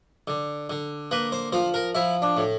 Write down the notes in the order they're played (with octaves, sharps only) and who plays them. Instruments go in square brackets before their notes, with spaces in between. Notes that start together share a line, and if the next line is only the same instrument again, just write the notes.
[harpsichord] D3
D3
A#3 B4
C5
F3 C5
A#4
F3 E4
D4
A2